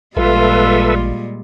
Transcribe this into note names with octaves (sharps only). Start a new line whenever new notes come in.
A1 A#2 G3 G#3 F4 A4 B4 E5